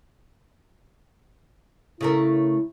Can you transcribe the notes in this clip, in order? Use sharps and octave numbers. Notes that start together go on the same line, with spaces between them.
C#3 A3 E4 A#4